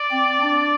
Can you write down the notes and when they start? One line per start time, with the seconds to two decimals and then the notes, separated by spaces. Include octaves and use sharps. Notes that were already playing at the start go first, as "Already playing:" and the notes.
Already playing: D5
0.11 C4
0.42 D4